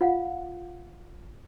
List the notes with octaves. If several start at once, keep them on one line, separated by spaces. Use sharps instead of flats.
F4 F5 F#5